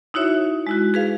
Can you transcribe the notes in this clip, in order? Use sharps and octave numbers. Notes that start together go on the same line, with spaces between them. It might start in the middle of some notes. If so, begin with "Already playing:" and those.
D#4 E4 F#4 C#5 E5
G#3 E4 F#4
G#4 B4 F5